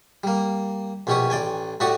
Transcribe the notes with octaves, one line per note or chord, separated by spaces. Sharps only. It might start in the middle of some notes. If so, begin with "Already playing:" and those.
G3 A#3
A#1 B2 C#4 G4 C#5 D#6
A1 D5 G5 G#5
A2 F#4 G4 D5 C#6 D#6